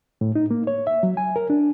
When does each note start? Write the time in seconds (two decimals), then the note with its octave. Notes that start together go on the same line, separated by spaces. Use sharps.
0.21 A2
0.35 D#4
0.51 A#3
0.67 C#5
0.87 E5
1.03 F#3
1.17 G#5
1.36 A#4
1.50 D4